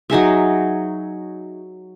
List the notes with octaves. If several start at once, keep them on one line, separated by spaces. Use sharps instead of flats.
F#3 D#4 G#4 E5